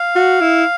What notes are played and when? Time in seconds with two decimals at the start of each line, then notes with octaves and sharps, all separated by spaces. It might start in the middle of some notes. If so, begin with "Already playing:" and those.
Already playing: F5
0.15 F#4
0.41 E4